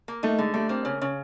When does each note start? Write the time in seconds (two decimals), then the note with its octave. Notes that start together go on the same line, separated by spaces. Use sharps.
0.08 A#3
0.23 A3 D#4
0.38 D3 G#3
0.54 G3 A3
0.69 A#3 C4
0.85 C#3 C#4
1.01 C#3 C#4